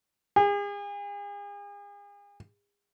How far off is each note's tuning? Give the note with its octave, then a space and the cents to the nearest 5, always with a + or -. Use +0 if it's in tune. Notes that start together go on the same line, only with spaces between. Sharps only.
G#4 -40